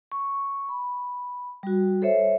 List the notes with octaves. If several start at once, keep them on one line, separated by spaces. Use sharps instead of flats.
C#6
B5
G3 F#4
A4 C5 C#5 E5